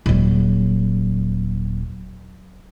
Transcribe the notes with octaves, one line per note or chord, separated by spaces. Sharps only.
D#1 F#3